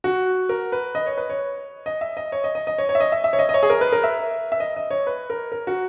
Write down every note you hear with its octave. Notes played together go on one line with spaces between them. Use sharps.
F#4
A#4
B4
D#5
C#5
B4
C#5
D#5
E5
D#5
C#5
D#5
D#5
D#5
C#5
C#5
E5
D#5
E5
E5
C#5
D#5
D#5
C#5
G#4
A#4
B4
A#4
E5
E5
D#5
D#5
C#5
B4
A#4
A#4
F#4